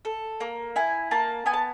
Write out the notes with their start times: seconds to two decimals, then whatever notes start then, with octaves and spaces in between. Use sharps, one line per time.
0.05 A4
0.40 A#3
0.76 E4 G#5
1.11 A#3 A5
1.46 B3 G#5
1.53 A5